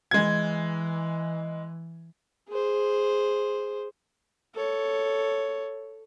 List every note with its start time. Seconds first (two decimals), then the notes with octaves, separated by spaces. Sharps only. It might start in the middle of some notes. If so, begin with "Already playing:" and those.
0.11 E3 G#3 G#6
2.49 G#4 C5
4.55 A4 C#5